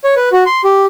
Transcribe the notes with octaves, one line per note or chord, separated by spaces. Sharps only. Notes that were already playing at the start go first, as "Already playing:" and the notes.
C#5
B4
F#4
C6
G4